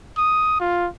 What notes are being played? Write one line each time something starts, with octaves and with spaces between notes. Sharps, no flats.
D#6
F4